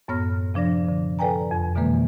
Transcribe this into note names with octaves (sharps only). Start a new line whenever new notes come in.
F#2 A2 B3 C#5 F6 A#6
C3 F3 D4 D5 A#6
D3
A4 B4 D5 G5 G#5 A#5
F2
B2 D3 E3 G#3 A#3 B4